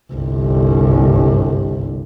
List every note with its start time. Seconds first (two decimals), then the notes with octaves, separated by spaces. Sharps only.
0.13 G1 C2